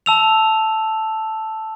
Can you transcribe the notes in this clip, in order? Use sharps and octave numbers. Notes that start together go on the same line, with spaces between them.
A5 E6 F7